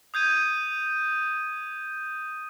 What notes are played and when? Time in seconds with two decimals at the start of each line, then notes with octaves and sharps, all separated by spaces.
0.14 D#6 G6 G#6 D#7